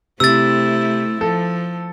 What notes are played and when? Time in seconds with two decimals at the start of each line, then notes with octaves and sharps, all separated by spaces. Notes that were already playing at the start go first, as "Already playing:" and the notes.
0.20 C3 A3 C4 E4 E6 A6
1.21 F3 A4